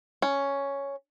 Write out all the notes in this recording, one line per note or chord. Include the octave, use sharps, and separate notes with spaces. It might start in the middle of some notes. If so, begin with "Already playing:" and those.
C#4